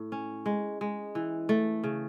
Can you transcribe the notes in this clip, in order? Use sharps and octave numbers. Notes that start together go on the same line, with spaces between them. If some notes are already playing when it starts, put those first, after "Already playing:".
Already playing: A2
C#4
G#3
G#3
E3
A3
C#3